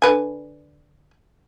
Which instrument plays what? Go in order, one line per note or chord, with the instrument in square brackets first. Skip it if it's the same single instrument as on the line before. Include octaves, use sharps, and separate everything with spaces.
[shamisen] D3 B4 G#5